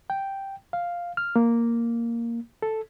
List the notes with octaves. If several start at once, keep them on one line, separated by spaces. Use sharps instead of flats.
G5
F5
F6
A#3
A4